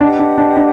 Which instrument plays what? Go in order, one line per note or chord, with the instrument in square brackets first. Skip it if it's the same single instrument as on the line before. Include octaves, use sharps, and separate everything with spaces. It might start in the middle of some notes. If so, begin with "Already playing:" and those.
[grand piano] D4 [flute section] G4 B4 D#5 F#5
[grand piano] D4
D4
D4